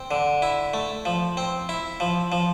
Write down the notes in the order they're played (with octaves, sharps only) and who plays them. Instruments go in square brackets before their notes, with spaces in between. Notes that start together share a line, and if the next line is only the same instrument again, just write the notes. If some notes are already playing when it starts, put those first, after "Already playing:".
Already playing: [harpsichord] C4
D3
E4
A3
F3
C4
E4
F3
F3